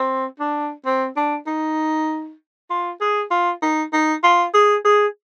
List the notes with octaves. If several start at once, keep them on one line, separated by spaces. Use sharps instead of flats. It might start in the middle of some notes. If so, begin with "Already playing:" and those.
Already playing: C4
D4
C4
D4
D#4
F4
G#4
F4
D#4
D#4
F4
G#4
G#4